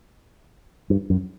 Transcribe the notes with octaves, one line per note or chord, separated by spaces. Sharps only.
G2
F#2